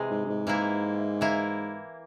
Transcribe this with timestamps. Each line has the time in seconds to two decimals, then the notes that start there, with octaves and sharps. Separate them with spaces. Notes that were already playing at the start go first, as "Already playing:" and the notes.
Already playing: C3 E3 G#3
0.11 G#2
0.25 G2
0.29 G#2
0.47 G#2 E3 A#3 E4
1.21 E3 A#3 E4